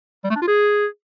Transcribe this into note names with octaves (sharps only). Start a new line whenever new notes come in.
G3
A3
D4
F4
G#4